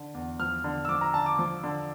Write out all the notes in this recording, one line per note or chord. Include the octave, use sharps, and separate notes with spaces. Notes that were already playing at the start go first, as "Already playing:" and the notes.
Already playing: D3
E2
F3 F6
D3
E6
F3 D6
A#5
D3 A5
D6
F3
D3